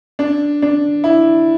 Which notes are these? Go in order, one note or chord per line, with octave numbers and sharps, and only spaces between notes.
D4
D4
E4